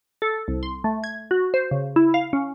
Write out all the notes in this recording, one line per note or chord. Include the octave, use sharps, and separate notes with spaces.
A4
C2
C6
A3
G#6
F#4
C5
C#3
E4
F5
C#4